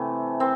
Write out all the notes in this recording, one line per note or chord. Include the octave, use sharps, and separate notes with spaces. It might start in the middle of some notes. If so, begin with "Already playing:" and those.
Already playing: C3 E3 A3
C4